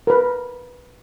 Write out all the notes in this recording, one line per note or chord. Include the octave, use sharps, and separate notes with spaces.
A#4 B4